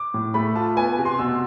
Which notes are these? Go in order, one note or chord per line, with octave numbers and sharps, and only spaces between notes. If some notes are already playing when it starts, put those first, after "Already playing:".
Already playing: D6
A2
A3 B5
F4 A5
B3 G#5
C3
C6
B2 E6